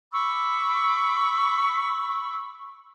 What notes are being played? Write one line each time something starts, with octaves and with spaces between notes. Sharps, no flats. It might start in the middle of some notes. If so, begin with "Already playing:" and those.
B5 C#6 D6 E6